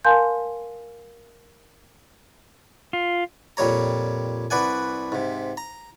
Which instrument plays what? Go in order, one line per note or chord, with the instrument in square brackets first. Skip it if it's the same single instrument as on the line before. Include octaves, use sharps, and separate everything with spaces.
[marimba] A#4 F5 G#5 A5 C6 G6
[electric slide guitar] F4
[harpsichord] F2 A#2 G3 C#5 A#5
C2 B4 D5 F#5 G#5
G#2 C3
A#5